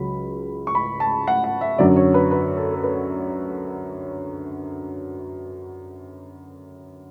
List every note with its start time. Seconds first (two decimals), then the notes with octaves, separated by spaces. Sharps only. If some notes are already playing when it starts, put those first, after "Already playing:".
Already playing: C#2 C#3 F#3 B5
0.67 C#6
0.75 B5
1.00 A5
1.27 F#5
1.44 F#5
1.61 E5
1.78 F#2 D3 F#3 D5
1.96 C#5
2.14 B4
2.31 B4
2.57 A4
2.73 A4
2.83 B4